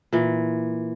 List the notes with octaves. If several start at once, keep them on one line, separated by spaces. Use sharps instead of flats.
A#2 E3